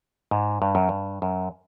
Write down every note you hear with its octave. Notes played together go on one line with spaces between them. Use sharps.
G#2
G2
F#2
G2
F#2